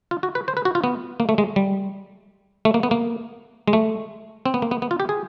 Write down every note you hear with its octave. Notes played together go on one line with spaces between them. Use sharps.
F4
F#4
B4
C5
B4
F#4
F4
B3
A#3
A3
G#3
G3
A3
A#3
B3
A#3
G#3
A3
C4
B3
A#3
B3
B3
F4
G4
G#4